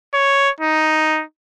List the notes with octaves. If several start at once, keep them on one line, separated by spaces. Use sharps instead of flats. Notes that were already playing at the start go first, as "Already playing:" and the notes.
C#5
D#4